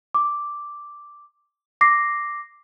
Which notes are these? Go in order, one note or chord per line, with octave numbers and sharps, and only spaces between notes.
D6
D6 A#6 C7